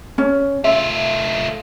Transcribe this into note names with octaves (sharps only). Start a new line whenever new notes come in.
C#4
A3 F4 E5